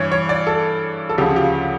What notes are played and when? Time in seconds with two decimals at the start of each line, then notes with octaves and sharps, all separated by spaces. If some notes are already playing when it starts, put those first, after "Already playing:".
Already playing: G2 E3 C#5
0.12 C#5
0.29 D5
0.47 A4
1.09 A4
1.18 D2 C#3 F3 G4
1.36 G4
1.41 F4